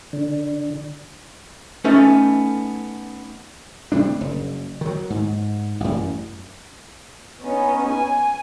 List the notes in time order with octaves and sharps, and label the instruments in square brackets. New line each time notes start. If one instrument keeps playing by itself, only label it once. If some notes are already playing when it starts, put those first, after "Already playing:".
[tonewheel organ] D3
[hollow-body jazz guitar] A3 B3 C#4 D#4 A4
[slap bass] C3 G3 A3 D4
F#1
D#3 F#3
G#2
A1 F#2
[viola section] B3 C#4 D#4
G#5